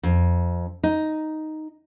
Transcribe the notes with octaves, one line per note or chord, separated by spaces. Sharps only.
F2
D#4